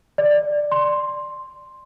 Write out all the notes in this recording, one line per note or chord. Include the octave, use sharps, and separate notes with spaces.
D5
C6